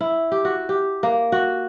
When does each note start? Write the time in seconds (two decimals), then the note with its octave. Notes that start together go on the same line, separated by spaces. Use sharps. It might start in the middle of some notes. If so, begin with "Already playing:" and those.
0.01 E4
0.32 G4
0.45 F#4
0.69 G4
1.03 A#3
1.32 F#4